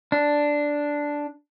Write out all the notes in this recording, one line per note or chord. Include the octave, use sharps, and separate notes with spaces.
D4